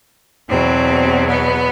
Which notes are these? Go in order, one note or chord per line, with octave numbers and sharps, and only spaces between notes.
E2 B2 F#3 C4
B3